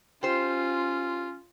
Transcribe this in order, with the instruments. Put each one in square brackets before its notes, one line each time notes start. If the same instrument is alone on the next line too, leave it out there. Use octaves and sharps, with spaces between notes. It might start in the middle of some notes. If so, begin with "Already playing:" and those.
[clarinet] C#4 [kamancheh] F4 [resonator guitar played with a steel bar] G4 C5